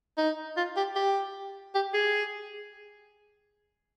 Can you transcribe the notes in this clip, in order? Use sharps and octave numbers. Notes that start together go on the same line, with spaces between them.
D#4
F4
G4
G4
G4
G#4